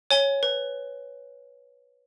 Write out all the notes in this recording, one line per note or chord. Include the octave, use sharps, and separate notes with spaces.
C#5 G#5 G7
B4